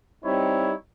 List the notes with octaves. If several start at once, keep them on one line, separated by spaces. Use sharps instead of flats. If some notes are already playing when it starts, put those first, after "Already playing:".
G3 C4 D#4 E4 C#5